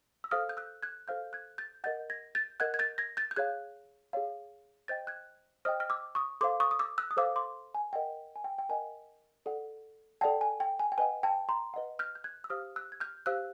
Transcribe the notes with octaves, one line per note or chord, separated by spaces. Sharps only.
E6
A4 C5 F5 D#6 F6
G6
E6 F#6
F#6 G#6
A4 C5 F5 F6 G6
F#6 G#6
G6 A6
A#4 D#5 F#5 G6 A6
G#6 A#6
G6 A6
A#4 D#5 F#5 F#6 G#6
G#6
G6 A6
G#6 A#6
G6 A6
G6
G#4 C#5 F5 F#6 G#6
G#4 C#5 F5
C5 D#5 G5 G6 A6
F#6 G#6
C5 D#5 G5 D#6 F6
F6
D6 E6
C#6 D#6
A4 C5 F5 C6 D6
C#6 D#6
D#6
D6 E6
E6 F#6
D#6
A4 C5 F5 D6 E6
C6 D6
G#5
A#4 D#5 F#5 G5
G#5
G5
G5
A#4 D#5 F#5 G#5
A4 D5 F#5
A4 D5 F#5 G5 A5
G#5
G5
G#5
G5
B4 D#5 F#5 G#5
G5 A5
A#5 C6
B4 D#5 F#5
F6 G6
G6
F#6 G#6
E6
G4 C5 F5 D#6 F6
E6 F#6
G#6
F6 G6
G4 C5 F5 E6 F#6